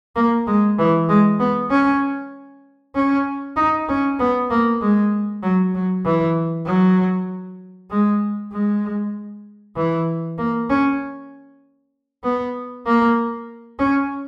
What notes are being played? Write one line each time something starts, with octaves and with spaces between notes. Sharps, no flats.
A#3
G#3
E3
G#3
B3
C#4
C#4
D#4
C#4
B3
A#3
G#3
F#3
F#3
E3
F#3
G#3
G#3
E3
A#3
C#4
B3
A#3
C#4